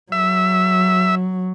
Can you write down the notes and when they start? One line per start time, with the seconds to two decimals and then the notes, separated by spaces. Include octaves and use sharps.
0.12 F#3 E5